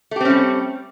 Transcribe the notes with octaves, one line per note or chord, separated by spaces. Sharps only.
G3 A3 C4 C#4 G4